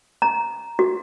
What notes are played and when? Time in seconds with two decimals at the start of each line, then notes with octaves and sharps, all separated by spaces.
0.22 A#5
0.79 F#4